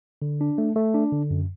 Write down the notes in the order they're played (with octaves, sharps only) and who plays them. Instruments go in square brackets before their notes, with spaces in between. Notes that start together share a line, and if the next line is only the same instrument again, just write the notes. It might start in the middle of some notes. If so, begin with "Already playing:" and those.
[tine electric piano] D3
D4
A3
A3
D4
D3
F#2